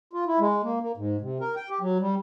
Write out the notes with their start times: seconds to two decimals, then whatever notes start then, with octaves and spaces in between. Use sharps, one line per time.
0.13 F4
0.27 E4
0.40 G#3
0.63 A#3
0.82 A#3
0.97 G#2
1.21 C3
1.40 A#4
1.55 G5
1.70 G4
1.81 F#3
2.00 G3